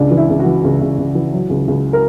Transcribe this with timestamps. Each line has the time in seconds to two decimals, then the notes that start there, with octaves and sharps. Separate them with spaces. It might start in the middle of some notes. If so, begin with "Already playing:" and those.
Already playing: C#2 D4
0.11 E3
0.17 E4
0.29 C#2
0.39 F#4
0.45 E3
0.64 C#2
0.81 C#2
0.98 C#2
1.15 E3
1.32 F#3
1.50 C#2
1.68 C#2
1.93 A#4